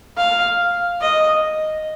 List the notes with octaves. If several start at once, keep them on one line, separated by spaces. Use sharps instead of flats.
F5
D#5